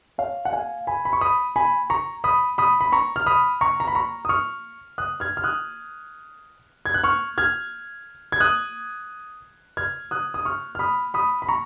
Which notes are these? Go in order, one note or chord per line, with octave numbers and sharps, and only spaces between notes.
C#5 F5
F#5
F5 G#5
G#5 B5
B5
C#6
B5 D#6
G#5 B5
A#5 C#6
B5 D#6
B5 D#6
B5
A#5 C#6
F6
B5 D#6
A#5 C#6
A#5
B5
A#5 C#6
D#6
C#6 F6
D#6 F#6
F6 G#6
F6
D#6 F#6
G#6
F#6
C#6 F6
F6 G#6
G#6
D#6 F#6
F6 G#6
D#6 F#6
D#6
C#6 F6
F6
B5 D#6
B5 D#6
B5
A#5 C#6